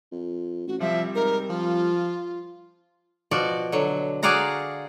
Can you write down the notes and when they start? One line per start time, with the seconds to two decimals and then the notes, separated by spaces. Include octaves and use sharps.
0.12 F2
0.68 A1 F#4
0.80 F3 G3 C4 E5
1.15 G#2 A#4
1.50 F3 F4
3.31 B2 F3 F#4 D5
3.72 D3 F#3
4.23 F#4 G#4 D5 F5 F#5 A#5